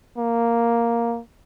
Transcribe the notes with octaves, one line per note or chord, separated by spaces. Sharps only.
A#3